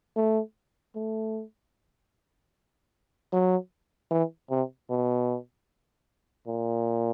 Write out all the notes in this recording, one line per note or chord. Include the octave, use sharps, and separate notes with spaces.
A3
A3
F#3
E3
C3
B2
A#2